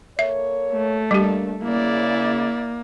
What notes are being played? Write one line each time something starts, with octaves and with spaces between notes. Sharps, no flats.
A#3 A4 C#5 E5
A3
G3 A#3 D4 G4
C#3 A#3 E4 D5